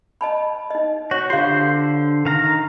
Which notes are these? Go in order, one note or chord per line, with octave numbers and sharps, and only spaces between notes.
D#5 A5 B5
D#4 D#5
F#4 C#5
D3 F4 G4 C5 F5
D#3 F5 A#5